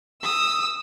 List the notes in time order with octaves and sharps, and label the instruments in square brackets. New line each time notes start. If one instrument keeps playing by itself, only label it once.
[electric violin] D#6 [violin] E6